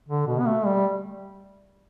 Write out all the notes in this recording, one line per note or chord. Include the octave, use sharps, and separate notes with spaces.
D3
B2
B3
A3
G3